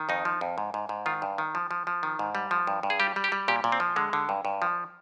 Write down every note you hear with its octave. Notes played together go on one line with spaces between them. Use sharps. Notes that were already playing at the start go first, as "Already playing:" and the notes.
Already playing: D#3
F2 D#4
F3
F2
G#2
G#2
G#2
D#3 F4
G2
D#3
F3
F3
F3
D#3
G#2
G3
F3
G2
G2
G#4
G3 G4
G3
G4
G3
A#2 G4
A#2
C4
F3
D3 G#3
D3
G2
G2
F3